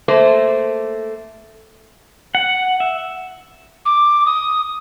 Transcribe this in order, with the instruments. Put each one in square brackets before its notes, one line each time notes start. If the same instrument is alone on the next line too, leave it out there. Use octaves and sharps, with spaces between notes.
[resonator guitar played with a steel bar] A3 A#3 C5
[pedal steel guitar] F#5
E5
[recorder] D6
D#6